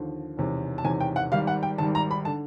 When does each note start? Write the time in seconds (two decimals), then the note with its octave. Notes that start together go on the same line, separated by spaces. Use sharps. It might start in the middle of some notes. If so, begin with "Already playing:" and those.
Already playing: D#2 D3 F3
0.37 E1 E2 C3 D#3
0.78 A5
0.84 E1 E2 C3 D#3 G#5
1.01 G5
1.16 F#5
1.31 G#1 G#2 D#3 G3 F5
1.47 F#5
1.63 G5
1.78 G#1 G#2 D#3 G3 A5
1.95 A#5
2.11 B5
2.25 D3 A5